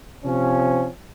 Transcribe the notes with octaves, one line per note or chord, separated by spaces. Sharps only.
C3 F3 C4 C#4